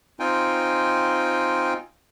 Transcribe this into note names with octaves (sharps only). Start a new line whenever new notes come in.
C4 D#4 F4 G5 G#5